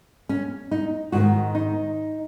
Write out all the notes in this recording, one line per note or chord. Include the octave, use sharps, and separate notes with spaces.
C#4
D#4
G#2 D#3 F#4
D#4